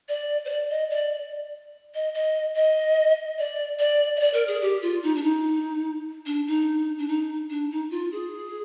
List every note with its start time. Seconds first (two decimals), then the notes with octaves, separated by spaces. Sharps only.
0.09 D5
0.45 C5
0.49 D5
0.70 D#5
0.90 D5
1.95 D#5
2.14 D#5
2.56 D#5
3.39 D5
3.79 D5
4.16 D#5
4.20 D5
4.34 A#4
4.48 G#4
4.62 G4
4.82 F4
5.03 D#4
5.15 D4
5.23 D#4
6.26 D4
6.47 D#4
6.98 D4
7.08 D#4
7.51 D4
7.71 D#4
7.91 F4
8.12 G#4